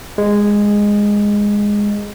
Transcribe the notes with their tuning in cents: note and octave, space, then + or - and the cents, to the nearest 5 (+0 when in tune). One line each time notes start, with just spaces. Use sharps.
G#3 -10